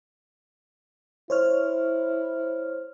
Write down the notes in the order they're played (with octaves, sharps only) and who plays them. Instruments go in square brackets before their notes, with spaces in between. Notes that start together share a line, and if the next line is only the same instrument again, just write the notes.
[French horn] E4 [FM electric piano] C5 C#5 F6